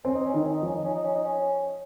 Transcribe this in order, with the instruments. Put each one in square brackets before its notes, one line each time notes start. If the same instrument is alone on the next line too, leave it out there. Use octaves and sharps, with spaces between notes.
[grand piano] C4 [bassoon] C#4
[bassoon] D#4
C#4
[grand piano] D#3 [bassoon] D#4
[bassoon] C#4
D#4
[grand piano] F3 [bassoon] C#4
[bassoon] D#4
C#4
D#4
C#4
D#4
C#4